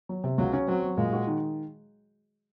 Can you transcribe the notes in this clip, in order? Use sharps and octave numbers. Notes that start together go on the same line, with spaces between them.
F#3
C3
C#2 F#3
C#4
F#3 C4
F#3
A#2 G#3
F#4
D#3